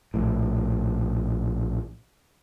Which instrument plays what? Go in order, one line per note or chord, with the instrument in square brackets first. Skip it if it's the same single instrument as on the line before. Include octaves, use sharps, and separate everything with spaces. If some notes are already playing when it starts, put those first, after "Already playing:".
[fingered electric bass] A#1 A2